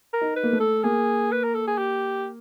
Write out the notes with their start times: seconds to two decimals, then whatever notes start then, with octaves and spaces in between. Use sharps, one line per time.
0.14 A#4
0.21 D#4
0.36 B4
0.43 A#3
0.53 A3
0.60 A4
0.83 A#3 G#4
1.32 B4
1.44 A#4
1.55 A4
1.67 G#4
1.78 G4